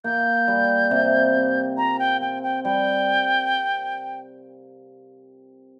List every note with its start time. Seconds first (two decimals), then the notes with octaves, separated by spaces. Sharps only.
0.04 A#3 G6
0.48 G3
0.91 C3
1.34 C3
1.77 F4 A#5
1.99 G5
2.21 C4 G5
2.43 G5
2.64 G3 G5